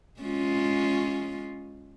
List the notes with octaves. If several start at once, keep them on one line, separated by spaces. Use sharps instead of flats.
G#3 C#4 F4